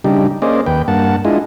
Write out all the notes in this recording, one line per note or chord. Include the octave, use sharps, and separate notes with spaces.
C#3 G3 D4 D#4 G4
A#3 C#4 G#4 C5 D5 D#5
D#2 B4 G5
G2 A#3 F#5 A5
G#3 D4 E4 F4 G#4 D#5